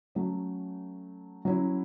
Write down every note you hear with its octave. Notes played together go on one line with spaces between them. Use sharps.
F#3 A3 C#4
F#3 C#4 E4